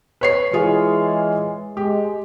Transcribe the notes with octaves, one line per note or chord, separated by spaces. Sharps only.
B4 C#5 C7
E3 G#3 F4 G#4 C#5
G#3 G4